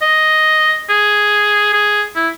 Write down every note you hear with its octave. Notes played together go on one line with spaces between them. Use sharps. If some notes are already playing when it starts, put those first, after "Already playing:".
D#5
G#4
G#4
E4